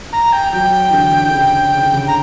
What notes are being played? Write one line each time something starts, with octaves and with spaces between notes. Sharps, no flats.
A#5
G5
F#3 G5
E3
D3
D3
C#3
C#3
D3
C#3
A#5